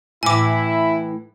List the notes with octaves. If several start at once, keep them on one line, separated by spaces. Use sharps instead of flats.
A2 E3 E4 G#5 D6